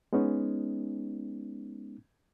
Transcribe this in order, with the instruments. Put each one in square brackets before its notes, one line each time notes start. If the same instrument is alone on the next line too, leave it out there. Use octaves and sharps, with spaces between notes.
[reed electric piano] G#3 B3 C#4 D#4